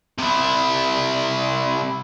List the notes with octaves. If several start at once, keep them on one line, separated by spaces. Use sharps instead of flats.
C3 E4